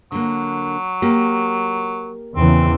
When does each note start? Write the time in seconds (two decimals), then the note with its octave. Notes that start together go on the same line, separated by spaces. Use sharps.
0.12 D3 F#3 A#3
1.02 A#3 G4
2.36 E2 C#3 E3 C4